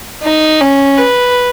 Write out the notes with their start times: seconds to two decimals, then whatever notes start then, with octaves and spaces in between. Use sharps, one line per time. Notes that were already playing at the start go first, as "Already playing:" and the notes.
0.23 D#4
0.61 C#4
0.98 B4